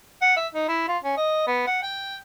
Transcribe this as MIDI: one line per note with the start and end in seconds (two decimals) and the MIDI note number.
0.21 0.35 78
0.37 0.48 76
0.55 0.65 63
0.69 0.83 64
0.88 0.98 65
1.04 1.15 61
1.17 1.43 75
1.47 1.66 59
1.67 1.80 78
1.83 2.17 79